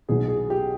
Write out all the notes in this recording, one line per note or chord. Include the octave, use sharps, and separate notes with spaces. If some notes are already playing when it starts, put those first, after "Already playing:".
B1 B2 G#4
G#4
G4